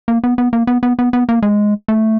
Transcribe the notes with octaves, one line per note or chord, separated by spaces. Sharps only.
A#3
B3
B3
A#3
B3
B3
B3
B3
A#3
G#3
A3